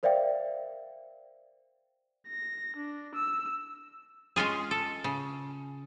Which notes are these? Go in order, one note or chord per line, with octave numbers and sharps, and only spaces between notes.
A#4 C5 D5 E5 F5 G5
A#6
D4
E6
G#3 C#4 F4 G#4
A4
C#3